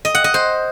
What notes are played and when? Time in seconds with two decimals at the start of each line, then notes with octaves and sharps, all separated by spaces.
0.05 D#5
0.15 F#5
0.24 D#5
0.34 C5